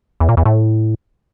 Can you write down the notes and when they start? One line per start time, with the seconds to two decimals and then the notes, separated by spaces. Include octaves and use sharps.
0.20 E2
0.29 A#2
0.37 E2
0.46 A2